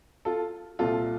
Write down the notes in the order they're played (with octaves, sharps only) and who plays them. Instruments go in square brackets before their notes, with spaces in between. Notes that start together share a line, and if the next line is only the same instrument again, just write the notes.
[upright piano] F4 A4
C2 A#2 F4 A4